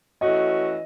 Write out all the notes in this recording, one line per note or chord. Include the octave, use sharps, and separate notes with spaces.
E3 A3 C#4 F#4 D#5